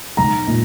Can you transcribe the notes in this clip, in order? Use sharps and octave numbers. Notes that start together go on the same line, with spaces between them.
B1 A#5
A#2